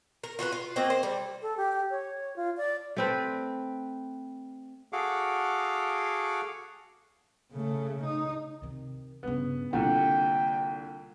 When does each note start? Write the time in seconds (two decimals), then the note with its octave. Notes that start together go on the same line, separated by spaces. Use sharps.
0.24 A#4
0.39 F4 F#4 A4 B4
0.52 F4
0.76 A#3 C4 F#4 D#5
0.90 C5
1.03 G3
1.42 A4
1.57 G4
1.90 C#5
2.36 F4
2.57 D5
2.96 A3 C4 B4
4.93 F#4 G#4 A4 F5 F#5 D6
7.52 C#3 A3
8.04 D#4
8.62 C3 D#3
9.23 G2 C#3 B3
9.73 C2 D3 G3 A#3 C4 F4 F#5 G5